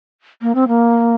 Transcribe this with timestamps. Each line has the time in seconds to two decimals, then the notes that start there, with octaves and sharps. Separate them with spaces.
0.42 A#3
0.55 C4
0.68 A#3